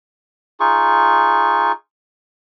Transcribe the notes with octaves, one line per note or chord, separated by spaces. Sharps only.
D#4 F4 G#4 C#6